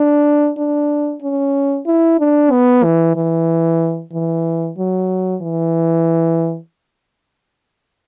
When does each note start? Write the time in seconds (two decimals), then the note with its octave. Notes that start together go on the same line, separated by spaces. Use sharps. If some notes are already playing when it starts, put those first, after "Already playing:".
Already playing: D4
0.58 D4
1.22 C#4
1.86 E4
2.19 D4
2.51 B3
2.84 E3
3.16 E3
4.13 E3
4.78 F#3
5.42 E3